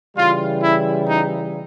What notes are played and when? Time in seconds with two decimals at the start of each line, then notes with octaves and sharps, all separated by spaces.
0.17 C#3 E3 G3 F4
0.62 E4
1.07 D#4